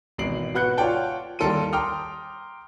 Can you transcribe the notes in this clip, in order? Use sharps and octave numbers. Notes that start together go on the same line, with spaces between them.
G#1 B2 E3 C7 D7 F#7
B2 F#4 B4 F#6 G6 C#7
F4 C#5 D5 F#5 G5 A5
D#2 G3 A4 A#4 C6 D#7
G5 A#5 C6 D6 D#6 F6